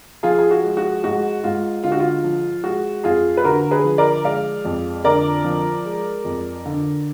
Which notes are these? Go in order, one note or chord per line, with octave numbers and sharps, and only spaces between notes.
F3 F4 G#4
G#4
F#4
G#3
F#4
G#2 F#4
G#2 F4
D3 F4
F#4
F4
F3
G#3 F#4
F2 F4 G#4
B4
D3 F#4 A#4
G#4 B4
F3
A#4 D5
G#3 D5 F5
F2
D3 A#4 D5
F3
G#3
F2
D3